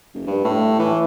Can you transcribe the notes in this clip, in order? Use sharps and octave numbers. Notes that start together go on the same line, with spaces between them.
F#1
G2
A2
E3